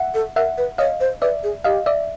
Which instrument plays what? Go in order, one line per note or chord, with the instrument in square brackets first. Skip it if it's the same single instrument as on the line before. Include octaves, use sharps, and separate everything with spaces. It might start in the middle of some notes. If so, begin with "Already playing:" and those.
Already playing: [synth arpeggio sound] E5 F#5
[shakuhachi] A4
[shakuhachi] A#4 [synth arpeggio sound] E5 F#5
[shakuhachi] B4
[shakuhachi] C#5 [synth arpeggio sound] D#5 F5
[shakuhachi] C5
[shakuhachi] B4 [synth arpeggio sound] D5 E5
[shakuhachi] G#4
[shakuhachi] G4 [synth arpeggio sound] D#5 F5
[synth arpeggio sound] D5 E5